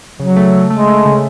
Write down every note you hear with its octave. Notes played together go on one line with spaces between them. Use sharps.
C#3 F#3
A3
A3
G#3 A3
A3
C#3